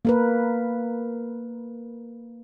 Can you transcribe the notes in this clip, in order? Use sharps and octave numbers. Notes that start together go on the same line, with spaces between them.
A#3 A#4 B4